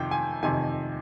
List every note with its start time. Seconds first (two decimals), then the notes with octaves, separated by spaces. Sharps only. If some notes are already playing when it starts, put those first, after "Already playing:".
Already playing: F2 C3 D#3 G5
0.11 G#5
0.43 F2 C3 D#3 G#5